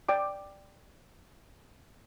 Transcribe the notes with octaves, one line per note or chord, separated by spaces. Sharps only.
D5 G5 D6